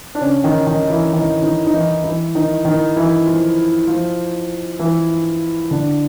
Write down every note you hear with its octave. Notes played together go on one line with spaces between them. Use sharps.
D4
C#3 C#4
D#3 D#4
D#3 D#4
E3 E4
D#3 D#4
D#3 D#4
D#4
E3 E4
E3 E4
D#3 D#4
D#3 D#4
E3 E4
F3 F4
F3 F4
E3 E4
D3 D4